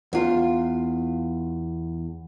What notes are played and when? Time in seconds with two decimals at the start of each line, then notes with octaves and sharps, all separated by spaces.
0.13 E2 F4